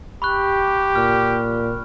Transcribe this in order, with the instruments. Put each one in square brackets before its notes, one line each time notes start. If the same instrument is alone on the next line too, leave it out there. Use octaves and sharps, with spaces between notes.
[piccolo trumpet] G4 [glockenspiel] B5 C#6 F#6
[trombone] A#2 [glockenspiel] F6